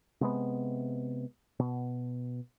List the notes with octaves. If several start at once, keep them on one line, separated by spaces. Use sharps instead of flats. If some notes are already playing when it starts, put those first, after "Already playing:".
C3 G#3 B3
B2